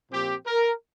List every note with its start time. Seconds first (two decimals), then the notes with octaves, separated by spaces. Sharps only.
0.11 A#2 F3 C4 G4
0.47 A#4